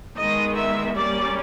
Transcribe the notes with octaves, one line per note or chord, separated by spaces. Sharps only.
D#3 G#3 B3 D#5
E5
G3 A#3 C#4 D5